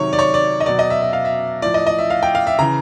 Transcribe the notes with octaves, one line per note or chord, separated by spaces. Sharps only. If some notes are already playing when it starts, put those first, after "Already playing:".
Already playing: C3 D#3 F#3 C#5
D5
C#5
D5
D#5
B2 F#3 D5
D#5
E5
E5
F5
E5
A2 F3 D5
D#5
D#5
E5
F5
G5
F5
E5
C#3 E3 A#5